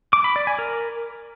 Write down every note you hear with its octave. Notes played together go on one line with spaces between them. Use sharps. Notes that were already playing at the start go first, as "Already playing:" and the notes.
D6
B5
D5
G#5
A#4